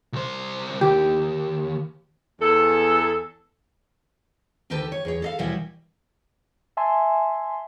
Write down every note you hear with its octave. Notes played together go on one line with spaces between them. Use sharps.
C2 C5
D#2 G4
E2 A4
D2 D#3 G4 A4 B4 A5
C#5
E2 G#4 C#5
A4 D#5 F5
D#2 B2 E3 G3 E4 F#4
E5 G#5 A5 C6